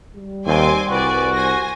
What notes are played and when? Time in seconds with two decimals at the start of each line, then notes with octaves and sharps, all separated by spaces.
0.17 G3
0.47 D#2 C4 G#5 C6 D6
0.89 C2 F#4 B4 D5 G#5
1.34 C5 G#5 A#6